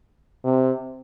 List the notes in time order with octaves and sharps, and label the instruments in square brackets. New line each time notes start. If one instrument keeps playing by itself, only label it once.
[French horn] C3